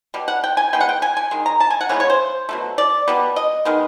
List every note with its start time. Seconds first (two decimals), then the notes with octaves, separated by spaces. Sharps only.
0.14 B2 G3
0.28 F#5
0.44 G5
0.57 G#5
0.73 E3 G#3 B3 G5
0.81 F#5
0.89 G5
1.02 G#5
1.17 G#5
1.31 D#3 G#3
1.46 A#5
1.60 A5
1.70 G#5
1.81 F#5
1.89 C#3 E3 G#3 B3 C#5
2.00 C#5
2.10 C5
2.49 B2 F#3 A3
2.78 D5
3.08 B2 G3 B3
3.36 D#5
3.65 D#3 G#3 B3